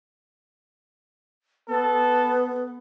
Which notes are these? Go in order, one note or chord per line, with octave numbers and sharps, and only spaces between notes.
B3 A4